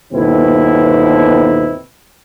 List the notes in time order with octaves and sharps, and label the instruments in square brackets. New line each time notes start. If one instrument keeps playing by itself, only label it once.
[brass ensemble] G1 D#2 B2 C4 E4